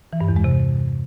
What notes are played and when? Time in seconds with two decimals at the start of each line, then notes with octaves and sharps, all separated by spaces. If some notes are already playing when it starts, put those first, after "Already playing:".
0.13 E3
0.21 G2
0.28 E2
0.36 G#3
0.44 C3